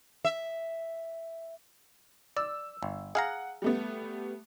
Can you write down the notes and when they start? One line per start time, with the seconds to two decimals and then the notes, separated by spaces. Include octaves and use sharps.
0.25 E5
2.37 D5 E6
2.83 G1
3.15 G#4 F5 F#5 A#5
3.62 G3 A3 B3